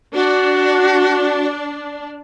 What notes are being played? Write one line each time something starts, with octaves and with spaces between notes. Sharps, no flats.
D4 F#4